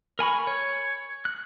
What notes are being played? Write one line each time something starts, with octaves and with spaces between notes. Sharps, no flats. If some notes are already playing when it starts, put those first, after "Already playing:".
A#4 G#5 B5 C#6
C#5
F#6